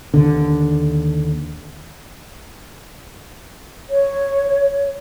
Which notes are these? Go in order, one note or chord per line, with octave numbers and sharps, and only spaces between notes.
D#2 D3
C#5